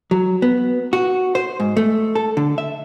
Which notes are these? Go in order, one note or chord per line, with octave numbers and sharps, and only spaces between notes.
F#3
B3
F#4
C5
G#2
A3
A4
D3
E5